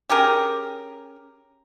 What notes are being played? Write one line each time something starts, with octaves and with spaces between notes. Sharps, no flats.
C#4 G4 G#4 A#4